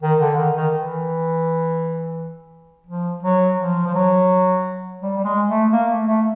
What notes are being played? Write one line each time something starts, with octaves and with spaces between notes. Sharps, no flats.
D#3
D3
D#3
D#3
E3
F3
F#3
F3
F3
F#3
G3
G3
G#3
A3
A#3
A3
A3